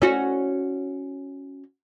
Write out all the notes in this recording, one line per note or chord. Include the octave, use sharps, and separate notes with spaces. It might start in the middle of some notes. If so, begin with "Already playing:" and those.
C#4 F#4